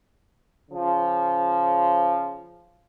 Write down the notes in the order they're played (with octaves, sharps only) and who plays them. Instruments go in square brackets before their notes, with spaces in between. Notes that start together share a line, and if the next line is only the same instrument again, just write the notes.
[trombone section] C#3 F3